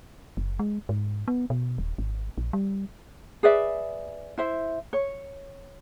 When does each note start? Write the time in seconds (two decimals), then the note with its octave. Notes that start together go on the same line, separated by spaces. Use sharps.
0.37 F#1
0.59 G#3
0.89 G#2
1.28 B3
1.50 B2
1.78 D#1
1.98 G#1
2.38 A#1
2.53 G3
3.43 G#4 B4 D5 E5
4.38 E4 C5 E5
4.93 C#5